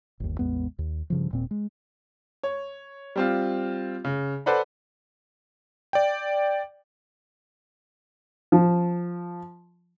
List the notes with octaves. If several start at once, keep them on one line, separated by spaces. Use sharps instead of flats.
G1 D#2
A1 E2 G#3 B3
D#2
G2 C#3 F3
D#1 A#2 C4
G#3
C#5
G3 C4 F4
C#3
A4 B4 C5 D5 F#5 B5
D5 G5
F3